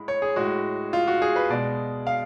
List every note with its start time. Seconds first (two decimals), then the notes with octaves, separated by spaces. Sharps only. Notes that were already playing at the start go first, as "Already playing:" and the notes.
Already playing: A2 G#3 B5
0.08 C#5
0.22 G#4
0.36 A2 G#3 F#4
0.93 F4
1.08 F#4
1.22 G#4
1.36 B4
1.50 B2 G#3 D5
2.07 F5